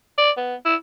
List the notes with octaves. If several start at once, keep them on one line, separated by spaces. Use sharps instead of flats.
D5
B3
E4